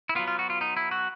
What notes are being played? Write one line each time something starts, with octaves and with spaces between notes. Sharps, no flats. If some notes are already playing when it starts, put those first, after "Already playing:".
E4
F#3 B3 F4
F4
F#4
F4
D#4
E4
F#4